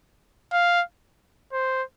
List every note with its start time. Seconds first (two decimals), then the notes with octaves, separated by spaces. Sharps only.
0.53 F5
1.53 C5